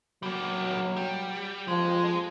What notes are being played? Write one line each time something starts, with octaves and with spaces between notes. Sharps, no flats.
F#3 G3 A#3
G3
F3 G#3